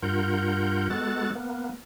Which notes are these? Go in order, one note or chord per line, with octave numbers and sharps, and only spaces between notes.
G2 F4 A#4 F#5 G6
G#3 B3 F#4 A4 F#6 A6
A#3 B3